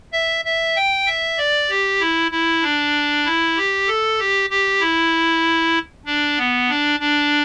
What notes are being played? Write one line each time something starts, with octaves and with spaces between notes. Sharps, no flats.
E5
E5
G5
E5
D5
G4
E4
E4
D4
E4
G4
A4
G4
G4
E4
D4
B3
D4
D4